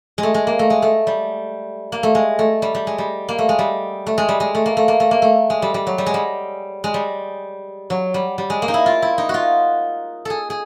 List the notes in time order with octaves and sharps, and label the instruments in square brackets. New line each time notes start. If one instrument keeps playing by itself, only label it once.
[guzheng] G#3
A3
G#3
A#3
A3
G#3
A3
G3
A#3
A3
G#3
A3
G3
G3
G#3
G3
A#3
A3
G#3
G3
A3
G#3
G3
G#3
A3
A#3
A3
A#3
A3
A#3
A3
G#3
G3
G3
F#3
G3
G#3
G3
G#3
G3
F#3
G3
G3
G#3
A#3
D#4
E4
F4
E4
D#4
F4 F#4
G#4 A4
G#4